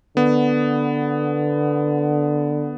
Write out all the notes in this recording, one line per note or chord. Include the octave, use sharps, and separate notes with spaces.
D3 B3